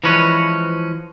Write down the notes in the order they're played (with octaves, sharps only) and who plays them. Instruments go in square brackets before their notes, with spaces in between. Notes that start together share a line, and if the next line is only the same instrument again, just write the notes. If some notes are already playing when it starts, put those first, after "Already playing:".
[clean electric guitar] E3 F3 G#3 C#4 B4 C#5